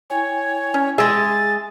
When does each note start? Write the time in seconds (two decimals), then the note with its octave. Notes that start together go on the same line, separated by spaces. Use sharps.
0.10 E4 C#5 G5 G#5
0.74 C#4
0.98 G#3 G#4 E5 A6